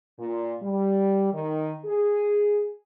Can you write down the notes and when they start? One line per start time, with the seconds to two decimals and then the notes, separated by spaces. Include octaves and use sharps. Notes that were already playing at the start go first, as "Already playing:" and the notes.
0.20 A#2
0.63 G3
1.33 D#3
1.86 G#4